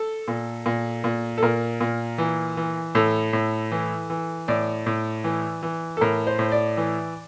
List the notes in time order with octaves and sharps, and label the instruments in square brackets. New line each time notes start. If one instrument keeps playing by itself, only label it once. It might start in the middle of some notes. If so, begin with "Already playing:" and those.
Already playing: [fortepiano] A4
A#2
A#2
A#2
A4
A#2 A#4
A#2
E3
E3
A2 A4
A2
E3
E3
A2 D5
A2
E3
E3
A4
A2 A#4
C5
A2
D5
E3